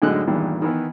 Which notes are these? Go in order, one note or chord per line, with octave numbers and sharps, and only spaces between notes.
F#2 A2 D3 G#3 D#4 F#6
E2 G2 A#2 D#3 E3
D#3 E3 B3